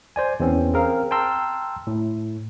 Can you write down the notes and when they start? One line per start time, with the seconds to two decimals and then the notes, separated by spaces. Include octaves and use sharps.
0.16 C5 D5 G#5
0.40 E2 E3 C4 C#4
0.74 C4 G#4 A#4 F5
1.11 G5 A5 A#5 C6 E6 F6
1.87 A2